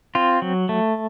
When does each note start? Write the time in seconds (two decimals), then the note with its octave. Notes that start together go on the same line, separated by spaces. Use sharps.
0.15 C4 F4
0.42 F#3
0.69 A3